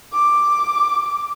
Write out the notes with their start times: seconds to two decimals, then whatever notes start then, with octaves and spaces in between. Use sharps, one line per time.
0.13 D6